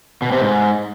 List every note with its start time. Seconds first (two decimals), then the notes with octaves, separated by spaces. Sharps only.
0.22 B2
0.32 C3
0.41 G#2